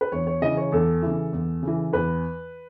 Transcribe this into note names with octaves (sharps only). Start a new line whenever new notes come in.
B4
E2 C#5
C#5
C#3 E3 D#5
C#5
E2 A4
C#3 E3
E2
C#3 E3
E2 B4